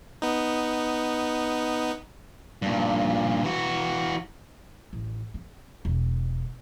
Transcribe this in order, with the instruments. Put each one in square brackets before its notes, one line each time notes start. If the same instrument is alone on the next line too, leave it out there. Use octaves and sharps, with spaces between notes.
[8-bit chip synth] B3 D#4
[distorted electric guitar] G2 A#2
E3 F#4
[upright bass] A1
C4
E1